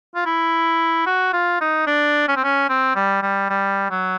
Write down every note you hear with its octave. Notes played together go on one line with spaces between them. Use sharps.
F4
E4
F#4
F4
D#4
D4
C#4
C4
C#4
C4
G3
G3
G3
F#3